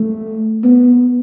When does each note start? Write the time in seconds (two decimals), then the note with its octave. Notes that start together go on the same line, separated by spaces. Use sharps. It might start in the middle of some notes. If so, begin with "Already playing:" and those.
Already playing: A3
0.64 B3